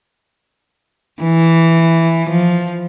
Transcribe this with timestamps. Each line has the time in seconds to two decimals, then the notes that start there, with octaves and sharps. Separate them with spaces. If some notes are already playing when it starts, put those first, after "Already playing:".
1.22 E3
2.30 F3